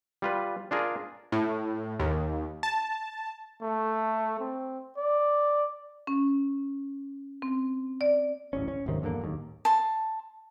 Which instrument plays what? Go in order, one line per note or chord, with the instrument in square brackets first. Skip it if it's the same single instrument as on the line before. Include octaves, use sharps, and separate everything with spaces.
[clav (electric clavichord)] G3 F4 B4
D4 F4 G#4 A#4
[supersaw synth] A2
D#2
A5
[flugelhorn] A3
C4
D5
[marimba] C#4
C4
D5
[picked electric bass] D1 A1 C#4
C#4
D1 G#1 C3 D#3
E2 G2 D3 A#3
D1 D#2
[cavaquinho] A5 C6